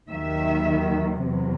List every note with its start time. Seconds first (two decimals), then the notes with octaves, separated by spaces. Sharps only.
0.10 D#2 D#3 F#3 E5
1.21 E2 C3 F#3